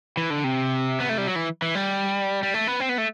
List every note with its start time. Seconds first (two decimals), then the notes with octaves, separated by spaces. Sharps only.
0.17 E3
0.30 D3
0.44 C3
1.00 B3
1.09 A3
1.18 G3
1.27 F#3
1.36 E3
1.62 E3
1.75 G3
2.43 G3
2.54 A3
2.67 B3
2.80 C4
2.89 B3
2.98 A3